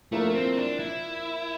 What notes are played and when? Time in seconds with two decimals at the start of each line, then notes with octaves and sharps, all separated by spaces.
0.12 F3 A3 A#3 E4 A#4
0.35 C4
0.57 D4
0.79 E4